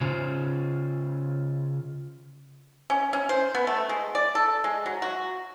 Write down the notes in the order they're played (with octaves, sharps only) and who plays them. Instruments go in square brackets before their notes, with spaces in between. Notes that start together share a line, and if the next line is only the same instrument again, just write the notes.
[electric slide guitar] C#3 C#4 F4 C5
[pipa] C#4
C#4
C5
B3
A3
G#3
D5
A4
G#3
F#3
F#4